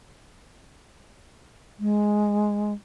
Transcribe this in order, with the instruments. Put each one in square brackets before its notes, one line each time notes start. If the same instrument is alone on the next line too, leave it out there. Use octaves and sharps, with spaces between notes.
[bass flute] G#3